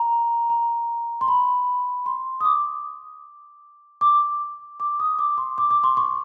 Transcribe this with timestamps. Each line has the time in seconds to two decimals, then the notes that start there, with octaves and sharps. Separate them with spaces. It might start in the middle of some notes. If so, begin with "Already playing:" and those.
Already playing: A#5
0.50 A#5
1.21 C6
1.28 B5
2.06 C6
2.41 D#6
2.45 D6
4.01 D6
4.80 D6
5.00 D#6
5.19 D6
5.38 C6
5.58 D6
5.71 D6
5.84 C6
5.97 C#6